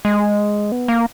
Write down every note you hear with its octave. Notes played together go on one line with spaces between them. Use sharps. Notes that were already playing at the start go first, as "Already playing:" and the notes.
G#3
B3
A#3